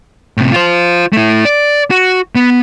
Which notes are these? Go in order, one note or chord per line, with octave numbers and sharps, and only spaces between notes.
A2 C3
F4 C5
A3 E4
D5
F#4
B3